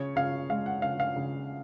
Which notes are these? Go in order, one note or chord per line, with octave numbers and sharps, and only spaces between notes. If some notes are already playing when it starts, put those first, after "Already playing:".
Already playing: C#3 C#5
C#3 F5
G#3 F5
F#5
C#3 F5
F5
C#3